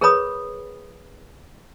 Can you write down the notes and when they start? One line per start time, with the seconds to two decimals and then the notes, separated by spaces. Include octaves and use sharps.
0.01 G#4 A#4 B4 C#5 B5 D#6